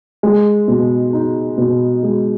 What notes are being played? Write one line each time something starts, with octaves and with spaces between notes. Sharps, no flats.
G#3
B2
D#4
B2
G#3